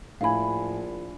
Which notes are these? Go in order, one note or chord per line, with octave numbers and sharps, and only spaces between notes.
A#1 A2 E4 F5 G#5 B5